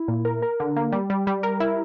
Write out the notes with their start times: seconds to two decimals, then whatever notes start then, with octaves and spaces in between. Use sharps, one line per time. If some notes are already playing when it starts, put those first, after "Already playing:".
Already playing: E4
0.08 A#2
0.25 A#4
0.42 A#4
0.60 D3
0.76 A#3
0.92 G3
1.10 G3
1.27 G3
1.43 A#4
1.60 E4